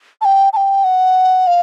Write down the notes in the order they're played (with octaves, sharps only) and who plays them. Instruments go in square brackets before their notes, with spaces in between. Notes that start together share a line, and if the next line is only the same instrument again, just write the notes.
[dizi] A5
G5
A5
G5
F#5
F5